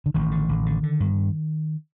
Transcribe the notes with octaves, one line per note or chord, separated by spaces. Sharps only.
D3
A1 D#3
D3
A1
D3
D3
G2